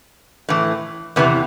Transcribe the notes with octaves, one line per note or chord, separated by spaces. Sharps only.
A2 E3
E2 C3 E3 B3